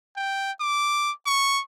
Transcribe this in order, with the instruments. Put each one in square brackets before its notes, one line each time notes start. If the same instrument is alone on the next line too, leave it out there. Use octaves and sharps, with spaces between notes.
[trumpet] G5
D6
C#6